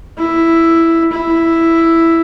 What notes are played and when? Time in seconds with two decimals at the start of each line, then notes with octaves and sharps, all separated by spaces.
0.18 E4
1.12 E4